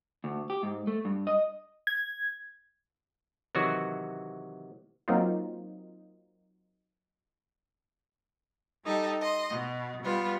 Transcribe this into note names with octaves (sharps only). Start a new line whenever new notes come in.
D2
G4
G#2
A3
G2
D#5
G#6
C3 D#3 E3 F#3 F#4
F#3 A#3 C4 D#4 F4
G3 D#4 G4 A4
D#5 C6
B2
G3 B3 F4